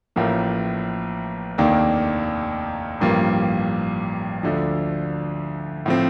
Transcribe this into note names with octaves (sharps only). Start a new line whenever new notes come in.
A1 A2 F3 A#3
F1 D#2 D#3 A#3 D4
A1 G2 F3 A#3
D2 D3 F3
A2 F3 C4